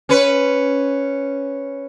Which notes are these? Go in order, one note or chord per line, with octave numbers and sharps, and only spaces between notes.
C#4 B4